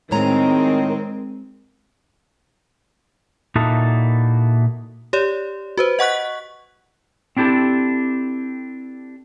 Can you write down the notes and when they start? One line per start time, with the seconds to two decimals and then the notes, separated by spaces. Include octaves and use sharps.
0.11 A2 D#3 G#3 C4 A#4 C#5 A#5
3.55 A#2 A#3 D#4 E4 F#4 A4
5.13 G4 C#5 D5
5.78 F#4 B4 C5
5.99 D#5 F#5 C#6 F#6 B6
7.37 C4 D4 E4 G4 A4